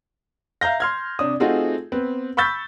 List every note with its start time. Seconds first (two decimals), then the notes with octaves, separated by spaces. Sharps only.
0.61 E5 F5 A#5 G6 A#6
0.80 C6 F6 G#6
1.19 C3 D4 D#6
1.40 A3 C4 D#4 F4 F#4 G#4
1.92 B3 C4 B4
2.37 B5 C#6 E6 G6 A6 B6